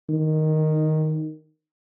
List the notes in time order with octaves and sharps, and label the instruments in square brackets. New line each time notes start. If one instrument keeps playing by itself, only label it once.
[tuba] D#3